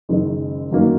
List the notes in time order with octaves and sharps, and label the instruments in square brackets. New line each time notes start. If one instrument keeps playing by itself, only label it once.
[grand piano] F#1 F#2 D#3 G#3
G1 F#2 D#3 F#3 A#3